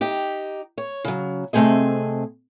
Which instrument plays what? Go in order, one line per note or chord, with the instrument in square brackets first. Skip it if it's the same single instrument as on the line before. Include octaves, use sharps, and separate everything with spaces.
[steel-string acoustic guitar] D#4 G4
C#5
C#3 F#3
C3 A3 C4 G#4 D#5